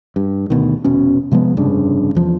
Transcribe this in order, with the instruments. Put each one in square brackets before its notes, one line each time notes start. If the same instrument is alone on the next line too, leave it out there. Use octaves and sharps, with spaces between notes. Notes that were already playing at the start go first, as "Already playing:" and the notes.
[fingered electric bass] G2
D2 B2 D#3
F1 B2 C#4
C3 F3 G#3 B3
F1 G2 C#3 D4
E2 F3